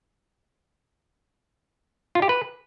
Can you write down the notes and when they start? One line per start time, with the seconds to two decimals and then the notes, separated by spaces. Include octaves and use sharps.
2.15 F4
2.22 G4
2.29 B4